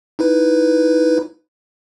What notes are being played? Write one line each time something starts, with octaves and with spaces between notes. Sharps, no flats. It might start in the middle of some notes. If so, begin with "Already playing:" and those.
D#4 E4 B4